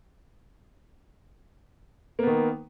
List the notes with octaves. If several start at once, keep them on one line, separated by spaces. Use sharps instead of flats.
D#3 A#3 B3